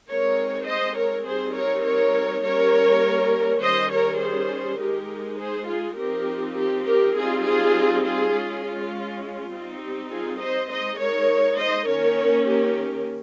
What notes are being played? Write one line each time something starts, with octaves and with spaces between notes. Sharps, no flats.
G#3 C4 D#4 A#4 C#5
C5 D#5
A#4 C#5
G3 C4 D#4 G#4 C5
A#4 C#5
A#4 C#5
G3 A#3 C#4 A#4 C#5
D#3 G3 C#4 C5 D#5
A#4 C#5
G#4 C5
G#3 D#4 G4 A#4
G#4 C5
F4 G#4
F3 C4 D#4 G4 A#4
G4
G4 A#4
G3 C4 D#4 F4 G#4
F4 G#4
F4 G#4
G#3 C#4
F4
F4
G3 C4 D#4
G4
F4 G#4
C5 D#5
G#3 D#4 C5 D#5
A#4 C#5
C5 D#5
D#3 A#3 C#4 A#4 C#5
G4 A#4